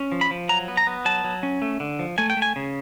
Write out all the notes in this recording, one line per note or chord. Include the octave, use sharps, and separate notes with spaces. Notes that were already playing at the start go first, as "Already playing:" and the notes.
Already playing: C#4
F3
B5
F3
F#3 A#5
B3
A#5
B3
F#3 A5
F#3
C#4
A3
D3
F3
A3 G#5
G5
A3
G#5
C#3